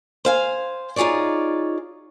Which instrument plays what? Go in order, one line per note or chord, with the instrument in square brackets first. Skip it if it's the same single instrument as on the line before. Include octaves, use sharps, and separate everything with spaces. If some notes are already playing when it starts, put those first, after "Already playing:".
[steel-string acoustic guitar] C5 F5 G#5
D#4 F4 G#4 C#5 D5